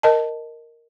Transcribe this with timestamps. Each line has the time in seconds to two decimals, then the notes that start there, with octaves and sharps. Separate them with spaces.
0.03 A#4 D#5 A5